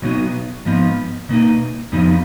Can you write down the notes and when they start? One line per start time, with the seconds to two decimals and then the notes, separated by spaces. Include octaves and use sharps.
0.02 B2 F#3 B3 D#4
0.65 G#2 F3 B3 D#4
1.29 B2 A#3 D#4
1.92 F2 F3 B3 D#4